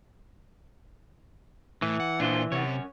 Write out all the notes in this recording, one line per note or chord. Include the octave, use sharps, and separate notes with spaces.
A2 E3
F#5
A#2 D4 F4 C5
F#2 C3 C#5